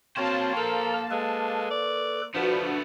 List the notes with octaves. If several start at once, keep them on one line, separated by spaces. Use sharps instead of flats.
A#3 C4 F#4 C5 C#5 F5 A5
A4 A#4 A#5
G#3 A4 B4
D5
F3 A3 B3 D4 F#4 B4